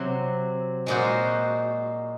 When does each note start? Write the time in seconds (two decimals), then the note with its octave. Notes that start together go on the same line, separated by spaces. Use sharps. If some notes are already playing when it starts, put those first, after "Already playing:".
Already playing: C3 F#3 C4
0.86 A#2 G#3 D#4 F#4 C5